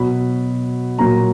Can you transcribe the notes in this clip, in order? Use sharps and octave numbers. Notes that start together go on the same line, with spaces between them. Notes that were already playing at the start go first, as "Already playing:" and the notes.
Already playing: B2 F#3 B5
A#2 F#3 A#5